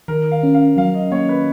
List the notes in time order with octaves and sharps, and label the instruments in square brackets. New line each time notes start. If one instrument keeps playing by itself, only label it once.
[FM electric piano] D#3 [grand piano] A#4
[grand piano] F5
[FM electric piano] C#4
[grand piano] F5
[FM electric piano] F#3 [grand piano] F5
[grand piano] D#5
[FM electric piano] A#3 [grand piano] C#5
[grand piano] B4